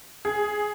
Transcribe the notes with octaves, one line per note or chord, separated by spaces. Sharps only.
G#4